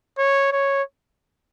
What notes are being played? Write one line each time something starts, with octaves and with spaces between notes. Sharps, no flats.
C#5
C#5